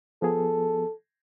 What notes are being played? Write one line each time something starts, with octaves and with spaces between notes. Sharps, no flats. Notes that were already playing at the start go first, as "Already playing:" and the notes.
F3 B3 G#4 A4